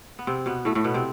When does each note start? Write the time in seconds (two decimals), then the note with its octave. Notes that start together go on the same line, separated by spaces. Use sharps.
0.19 B3
0.27 C3 C4
0.46 B2 B3
0.65 A2 A3
0.75 A2 A3
0.84 B2 B3
0.94 C3 C4